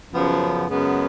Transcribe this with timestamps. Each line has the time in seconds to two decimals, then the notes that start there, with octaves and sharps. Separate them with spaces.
0.10 F#2 C#3 F3 B3
0.68 F#2 C#3 G#3 B3